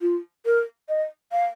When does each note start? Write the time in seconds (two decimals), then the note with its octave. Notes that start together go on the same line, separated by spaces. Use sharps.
0.01 F4
0.45 A#4
0.89 D#5
1.32 F5